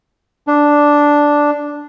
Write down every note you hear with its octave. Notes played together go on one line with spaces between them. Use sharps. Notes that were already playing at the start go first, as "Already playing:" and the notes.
D4